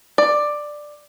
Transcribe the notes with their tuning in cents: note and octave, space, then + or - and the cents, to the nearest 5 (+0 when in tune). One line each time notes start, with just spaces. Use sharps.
D5 +10